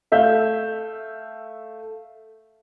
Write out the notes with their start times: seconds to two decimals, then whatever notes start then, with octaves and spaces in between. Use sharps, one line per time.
0.12 A3 E5 F5 G6